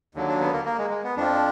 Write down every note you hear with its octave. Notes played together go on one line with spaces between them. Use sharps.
D#2 D3 F#3
D4
B3
A#3
A#3
G#3
G#3
B3
F2 F3 D4